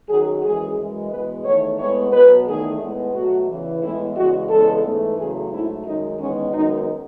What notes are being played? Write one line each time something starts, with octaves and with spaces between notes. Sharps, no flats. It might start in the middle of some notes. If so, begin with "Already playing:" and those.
F#2 D#3 F#3 G#4
F#2 E3 G#3 G#4
F#2 E3 G#3
E2 B2 G#3 B3 B4
E2 D#3 A3 C#5
A2 G#3 B3 C#5
B2 F#3 B3 B4
E2 D#3 A3 G#4
A2 G#3 B3
B2 F#3 A3 F#4
E2 C#3 E3
A2 E3 G#3 B3 E4
E2 C#3 G#3 F#4
E2 C#3 G#3 B3 A4
G#2 E3 A3
E2 C#3 F#3 A3 G#4
G#2 F#3 A3 E4
F#2 D#3 G#3 D#4
E2 D#3 G#3 B3 C#4
F#2 D#3 G#3 B3 D#4